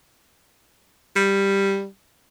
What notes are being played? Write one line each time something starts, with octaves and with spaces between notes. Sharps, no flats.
G3